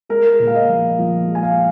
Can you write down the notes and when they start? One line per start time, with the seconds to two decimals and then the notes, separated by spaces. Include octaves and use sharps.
0.09 G#3 A#4
0.40 A#2
0.47 F5
0.55 D#5
0.69 F3
0.99 F3
1.27 G#3
1.35 G#5
1.43 F5